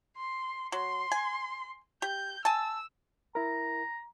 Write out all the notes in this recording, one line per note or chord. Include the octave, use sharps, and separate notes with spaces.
C6
F#3 C6
G#5
G4 G6
G#5 A5 E6
E4 A#4 A#5